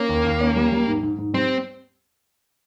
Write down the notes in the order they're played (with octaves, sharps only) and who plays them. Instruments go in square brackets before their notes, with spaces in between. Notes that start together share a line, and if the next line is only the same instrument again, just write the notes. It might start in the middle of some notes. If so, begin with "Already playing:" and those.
Already playing: [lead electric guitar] A#3 [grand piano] C#4
[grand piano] D#2
D#2
C#4
G3
G3
G#2
G#2
G#2
[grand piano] G3 [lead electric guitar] C4